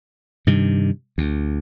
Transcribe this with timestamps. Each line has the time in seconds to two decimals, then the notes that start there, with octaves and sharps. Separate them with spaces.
0.47 G2 C3 D#3
1.18 D2